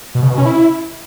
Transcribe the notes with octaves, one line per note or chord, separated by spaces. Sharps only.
B2
C#3
B2
C#4
E4